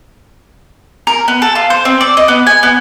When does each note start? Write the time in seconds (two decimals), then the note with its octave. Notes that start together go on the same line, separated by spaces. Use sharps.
1.07 A#4
1.28 B3
1.42 A4
1.55 F4
1.70 C5
1.85 C4
2.01 D5
2.17 D#5
2.28 B3
2.47 G#5
2.63 B3